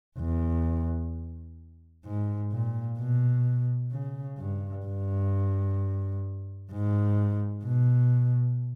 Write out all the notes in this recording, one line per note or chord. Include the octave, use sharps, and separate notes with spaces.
E2
G#2
A#2
B2
C#3
G2
G2
G#2
B2